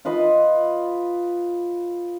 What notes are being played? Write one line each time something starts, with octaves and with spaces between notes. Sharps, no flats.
F4 B4 D#5